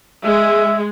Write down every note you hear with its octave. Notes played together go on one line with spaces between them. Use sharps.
G#3 E5